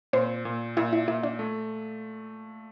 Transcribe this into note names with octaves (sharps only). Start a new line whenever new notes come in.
A#2 C4 C5
A#2
A#2 E4 E5
E4 E5
A#2 E4 E5
D4 D5
A3